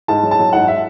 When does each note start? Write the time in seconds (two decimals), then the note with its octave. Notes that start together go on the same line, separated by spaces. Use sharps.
0.08 G#2 A5
0.23 F#3
0.31 A5
0.39 F#3
0.53 G#2 F#5
0.68 E5